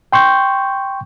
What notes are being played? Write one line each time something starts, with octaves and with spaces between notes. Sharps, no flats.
G5 C6 C#6 G6